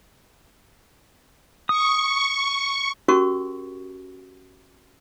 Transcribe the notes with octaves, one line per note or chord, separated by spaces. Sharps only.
C#6 D#6
C#4 F#4 G4 A#4 C#6